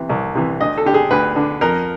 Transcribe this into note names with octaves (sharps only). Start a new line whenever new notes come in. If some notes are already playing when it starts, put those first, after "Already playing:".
Already playing: C3 E3
C2
C3 E3
D2 D#5
A4
D3 G4
G#4
D2 B4
D3
F2 A#4